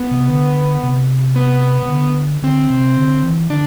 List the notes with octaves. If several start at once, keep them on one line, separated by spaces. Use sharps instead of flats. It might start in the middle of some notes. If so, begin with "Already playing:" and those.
Already playing: B3
C3
D3
C3
B3
C3
D3
D3 C4
C3
D3
E3
D3 D4